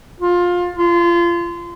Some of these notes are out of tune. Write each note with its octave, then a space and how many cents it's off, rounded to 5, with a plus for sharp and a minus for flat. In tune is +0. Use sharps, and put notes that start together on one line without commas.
F4 +20
F4 -25